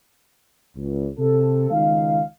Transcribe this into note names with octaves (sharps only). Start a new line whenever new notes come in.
C#2
C3 A4
C#2 D#3 G#3 D#4 F5